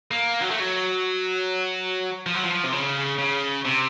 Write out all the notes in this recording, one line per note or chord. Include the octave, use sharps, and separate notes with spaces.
A#3
F#3
A3
F#3
F3
F#3
F3
C3
C#3
C#3
C3